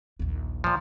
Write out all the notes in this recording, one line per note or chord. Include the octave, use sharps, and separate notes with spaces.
A#1 D#2
A#2 F3